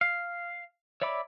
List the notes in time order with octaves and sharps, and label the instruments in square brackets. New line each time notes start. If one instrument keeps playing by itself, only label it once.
[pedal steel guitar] F5
C#5 D5 E5 B5 D6